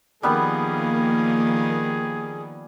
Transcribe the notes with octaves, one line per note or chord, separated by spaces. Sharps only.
D#3 F3 G3 A#3 B3 G#4 B5